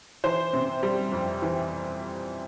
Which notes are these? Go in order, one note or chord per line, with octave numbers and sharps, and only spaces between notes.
E3 C5
C3
G3
F2
E3